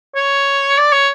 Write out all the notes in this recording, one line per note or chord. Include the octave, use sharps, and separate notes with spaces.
C#5
D5
C#5